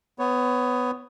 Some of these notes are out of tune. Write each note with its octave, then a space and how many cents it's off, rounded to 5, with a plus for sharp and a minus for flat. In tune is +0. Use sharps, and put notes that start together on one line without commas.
B3 +15 C#5 +0